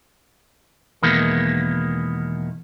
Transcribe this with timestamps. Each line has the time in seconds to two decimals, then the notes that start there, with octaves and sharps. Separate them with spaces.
1.02 E2 B2 D#3 G#3 A#3 B3